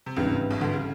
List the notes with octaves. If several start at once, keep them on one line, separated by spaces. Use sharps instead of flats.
C3
G#1 C#2 G2 C#3 E3
B1 B2
D2 D3
C#3